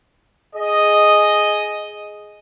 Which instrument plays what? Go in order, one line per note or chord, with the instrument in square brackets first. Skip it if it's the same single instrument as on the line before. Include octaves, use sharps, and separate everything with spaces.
[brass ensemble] G#4 D#5